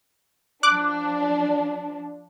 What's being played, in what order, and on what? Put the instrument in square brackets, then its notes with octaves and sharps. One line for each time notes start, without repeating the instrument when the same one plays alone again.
[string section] F3 D4 [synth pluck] D6 F#6